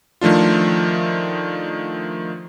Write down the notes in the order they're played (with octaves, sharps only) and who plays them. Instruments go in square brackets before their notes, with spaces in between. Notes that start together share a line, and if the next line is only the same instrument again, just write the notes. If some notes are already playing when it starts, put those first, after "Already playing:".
[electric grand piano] D#3 F3 A3 D4 F4